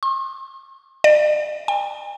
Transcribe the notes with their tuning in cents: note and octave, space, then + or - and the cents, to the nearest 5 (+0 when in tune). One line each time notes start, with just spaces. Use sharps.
C6 +45
D5 +40
G5 +45